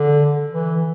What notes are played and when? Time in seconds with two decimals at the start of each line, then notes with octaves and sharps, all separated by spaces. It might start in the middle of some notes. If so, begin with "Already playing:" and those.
Already playing: D3
0.52 E3